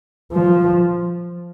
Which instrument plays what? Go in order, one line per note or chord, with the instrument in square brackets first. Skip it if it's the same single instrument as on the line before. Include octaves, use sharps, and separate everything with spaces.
[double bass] F3